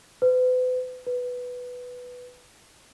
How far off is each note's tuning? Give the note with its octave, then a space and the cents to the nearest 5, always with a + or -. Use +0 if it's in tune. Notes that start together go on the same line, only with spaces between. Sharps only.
B4 +40
B4 +0